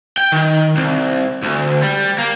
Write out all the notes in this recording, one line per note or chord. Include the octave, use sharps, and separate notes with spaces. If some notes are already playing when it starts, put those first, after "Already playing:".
G5
D#3
C2
D2
G3
A#3